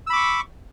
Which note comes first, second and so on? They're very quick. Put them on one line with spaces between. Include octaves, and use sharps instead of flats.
E6 B5 D6 C#6